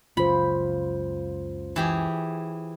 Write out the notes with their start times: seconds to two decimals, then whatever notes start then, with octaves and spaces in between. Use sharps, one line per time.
0.17 C#2 F#2 C#3 F4 C5 B5
1.76 E3 G4 G#4